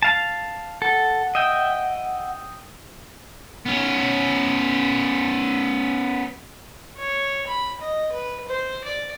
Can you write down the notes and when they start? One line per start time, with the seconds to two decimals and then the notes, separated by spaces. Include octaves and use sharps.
0.03 F5 A5
0.82 A4 F#5
1.35 D#5 E5 G5
3.66 B3 C#4
6.97 C#5
7.47 B5
7.81 D#5
8.12 B4
8.48 C5
8.84 D5